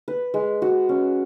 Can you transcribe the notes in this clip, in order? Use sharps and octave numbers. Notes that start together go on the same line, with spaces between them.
B4
G#3
F#4
C#4